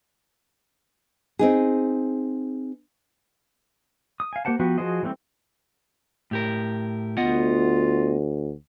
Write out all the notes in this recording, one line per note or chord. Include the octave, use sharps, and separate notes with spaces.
C4 D#4 G#4
D#6
F5 G#5
A#3 G4 C5 F#5 A5
F3 B3 F#4 G4
F3 F#4 G#4 C5 D#5
E3 G3 A3 B3 C4
A2 G4 A#4
D2 B3 F4 D#5 F#5